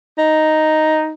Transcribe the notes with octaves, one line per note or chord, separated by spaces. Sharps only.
D#4